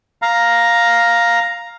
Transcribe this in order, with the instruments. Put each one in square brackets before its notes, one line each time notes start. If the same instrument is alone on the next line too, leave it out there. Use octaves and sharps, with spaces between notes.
[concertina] F5 A#5